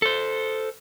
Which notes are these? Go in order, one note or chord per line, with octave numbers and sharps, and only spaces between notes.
A4 C5